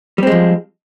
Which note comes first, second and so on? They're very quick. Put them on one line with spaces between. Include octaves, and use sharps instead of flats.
G3 C4 G#3 F3